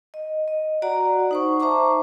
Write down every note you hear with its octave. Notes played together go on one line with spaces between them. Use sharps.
D#5
D#5
F#4 D5 F#5 A#5
D#4 C5 C#6
C5 E5 A5 A#5 C#6 D6